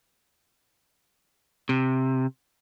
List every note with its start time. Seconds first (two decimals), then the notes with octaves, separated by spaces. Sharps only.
1.69 C3